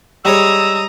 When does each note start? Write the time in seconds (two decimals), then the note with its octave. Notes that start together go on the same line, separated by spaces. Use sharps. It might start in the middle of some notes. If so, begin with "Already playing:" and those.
0.25 G3 G#3 C#5 A#5 D#6 E6